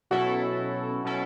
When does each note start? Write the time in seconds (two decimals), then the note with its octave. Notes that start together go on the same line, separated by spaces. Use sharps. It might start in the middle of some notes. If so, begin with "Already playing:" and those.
0.11 B2 F#3 C#4 E4 F#4 A4
1.04 B2 F#3 C#4 E4 A4